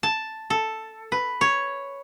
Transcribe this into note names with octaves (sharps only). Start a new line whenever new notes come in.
A5
A4
B4
C#5